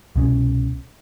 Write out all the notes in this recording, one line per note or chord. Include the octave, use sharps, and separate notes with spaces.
C2 B2 C#4